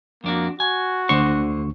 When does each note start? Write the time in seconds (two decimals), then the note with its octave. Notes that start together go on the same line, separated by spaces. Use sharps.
0.24 F2 A#3 D4 F#4
0.60 F#4 G#5
1.09 D2 D3 D4 C5 C#6